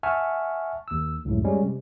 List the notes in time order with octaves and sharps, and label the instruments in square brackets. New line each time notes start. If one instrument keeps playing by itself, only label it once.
[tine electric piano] E5 F#5 G#5 A5 C#6 F6
D#2 E6
C#2 F#2 A2
G3 G#3 C#4
C3